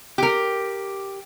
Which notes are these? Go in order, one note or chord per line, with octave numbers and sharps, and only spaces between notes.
G4 A#4